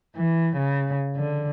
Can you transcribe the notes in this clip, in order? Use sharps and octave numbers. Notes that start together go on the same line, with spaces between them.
E3
C#3
D3